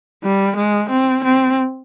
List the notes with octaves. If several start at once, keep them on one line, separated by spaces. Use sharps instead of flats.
G3
G#3
C4
C4